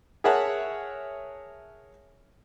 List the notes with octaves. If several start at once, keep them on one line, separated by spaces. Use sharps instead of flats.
G#4 A#4 C#5 E5 F#5 A5